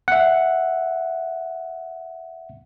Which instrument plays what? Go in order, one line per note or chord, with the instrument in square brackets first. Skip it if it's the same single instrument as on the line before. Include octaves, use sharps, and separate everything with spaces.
[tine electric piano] E5 F#5